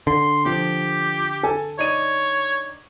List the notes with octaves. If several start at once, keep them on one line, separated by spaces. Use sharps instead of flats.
D3 C6
F3 C4 G4
A4 G#5 A5
D#4 C#5 D5 D#7